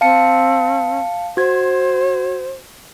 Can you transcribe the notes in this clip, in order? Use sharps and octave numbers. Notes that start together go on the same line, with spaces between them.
C4 F5 A5 C#7
F#4 C5 G#6